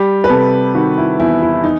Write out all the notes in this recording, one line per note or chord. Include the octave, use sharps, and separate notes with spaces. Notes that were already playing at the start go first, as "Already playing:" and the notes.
Already playing: G3 G4
B4
C3 A4
D#3 F#4
E4
E2 E4
E4
D#4